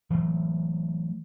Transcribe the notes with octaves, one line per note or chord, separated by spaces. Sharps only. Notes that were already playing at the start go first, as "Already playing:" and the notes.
E3 F#3 A3